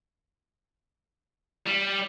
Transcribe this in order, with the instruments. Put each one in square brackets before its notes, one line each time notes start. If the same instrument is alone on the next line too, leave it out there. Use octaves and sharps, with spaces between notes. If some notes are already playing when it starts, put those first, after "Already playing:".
[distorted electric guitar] G3